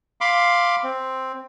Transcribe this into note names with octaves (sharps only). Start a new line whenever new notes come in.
F5 B5 C6 D6
C4